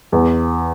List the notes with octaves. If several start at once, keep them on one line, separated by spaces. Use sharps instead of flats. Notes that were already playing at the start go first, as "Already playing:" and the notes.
E2